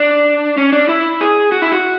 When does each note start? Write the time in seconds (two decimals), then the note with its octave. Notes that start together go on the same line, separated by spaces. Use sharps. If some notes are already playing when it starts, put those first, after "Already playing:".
Already playing: D4
0.58 C#4
0.73 D4
0.89 E4
1.21 G#4
1.52 F#4
1.62 E4
1.72 F#4